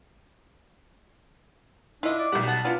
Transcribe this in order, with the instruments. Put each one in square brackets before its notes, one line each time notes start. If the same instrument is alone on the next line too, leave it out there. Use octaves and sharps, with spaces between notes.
[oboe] D4 [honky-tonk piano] E4 [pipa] F4 D#5
[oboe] D5
[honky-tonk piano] B1 G3 [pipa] F#5
[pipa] F#5 [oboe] A5
[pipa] F#3 B3 D4 [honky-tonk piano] F4